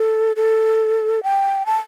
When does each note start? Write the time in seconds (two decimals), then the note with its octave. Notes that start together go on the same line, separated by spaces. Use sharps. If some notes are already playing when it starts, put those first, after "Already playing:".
Already playing: A4
0.36 A4
1.23 G5
1.66 A5